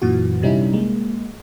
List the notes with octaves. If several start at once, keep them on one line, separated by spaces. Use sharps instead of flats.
F#2 A#2 E3 F#4
C3 G3 C#4 D#4 E4
G#3 A#3